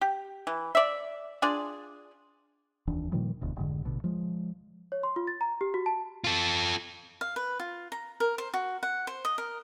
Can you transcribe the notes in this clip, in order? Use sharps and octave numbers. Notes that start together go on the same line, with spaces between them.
G4
E3
D5 E5
D4 F4 G#4 D5
F1 D#2 E3 D4
A#2 D#3 F3 G3
E1 D2 B2
F1 G#2 D3
A1 B2 D3
F3 G#3
C#5
C6
F4
A6
A#5
G4
F#4
A5
F4 A4
F5
B4
F4
A#5
A#4
C5
F#4
F#5
C5
D#5
A#4